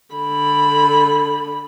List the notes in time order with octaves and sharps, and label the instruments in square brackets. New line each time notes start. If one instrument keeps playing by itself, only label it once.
[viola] D3 B5